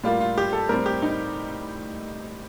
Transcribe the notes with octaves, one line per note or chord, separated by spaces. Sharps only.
A2 G3 A#3 F4
F4
G4
A4
A2 G3 C4 A#4
G4
D#4